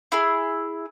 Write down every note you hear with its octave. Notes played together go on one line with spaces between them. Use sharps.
E4 G#4